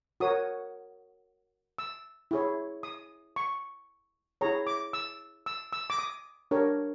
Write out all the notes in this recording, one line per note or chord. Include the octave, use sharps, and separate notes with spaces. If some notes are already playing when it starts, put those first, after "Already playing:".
F#4 A#4 C#5 D#6
E6
E4 G#4 C#5
D#6
C#6
E4 G#4 C#5 A#5
D6
E6
E6
E6
D6
D#6
D4 G4 A#4 C#5